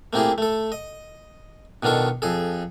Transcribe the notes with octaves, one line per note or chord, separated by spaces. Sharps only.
A3 A#3 C4 E4 G4 G#4
A3 A4
D#5
B2 D#3 D4 F4 A4 C#6
F2 G#4 A4